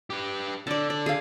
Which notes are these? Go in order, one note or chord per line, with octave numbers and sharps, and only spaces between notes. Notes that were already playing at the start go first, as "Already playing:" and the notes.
G4 B4
D3 D5 A5
D5
G#4 F5